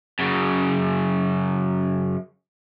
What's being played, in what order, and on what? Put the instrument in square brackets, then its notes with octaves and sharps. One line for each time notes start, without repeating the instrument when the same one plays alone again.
[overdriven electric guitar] F#2 C#3